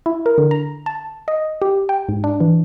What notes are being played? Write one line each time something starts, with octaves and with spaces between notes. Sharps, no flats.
E4
A#4
D3
A#5
A5
D#5
G4
G5
G#2
D4
E3